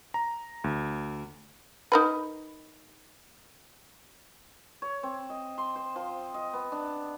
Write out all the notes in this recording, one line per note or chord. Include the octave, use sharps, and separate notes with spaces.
A#5
D2
D#4 A#4 B4
C#5
C4
D#5
C6
C5
F3
D#5
B3
D4